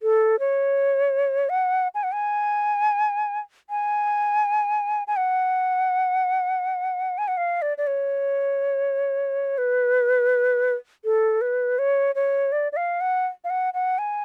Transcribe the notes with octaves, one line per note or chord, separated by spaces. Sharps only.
A4
C#5
F#5
G#5
F#5
G#5
G#5
G#5
F#5
G#5
F#5
F5
D5
D5
C#5
B4
A4
B4
C#5
C#5
D5
D5
F5
F#5
F5
F#5
F#5
G#5